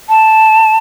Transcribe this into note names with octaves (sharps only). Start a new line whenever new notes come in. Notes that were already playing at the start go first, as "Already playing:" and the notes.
A5